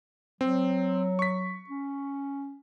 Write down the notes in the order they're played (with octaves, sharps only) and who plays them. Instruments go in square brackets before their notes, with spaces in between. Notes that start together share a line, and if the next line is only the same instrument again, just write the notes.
[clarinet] F#3 [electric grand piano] C4
[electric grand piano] C#6 B6
[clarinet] C#4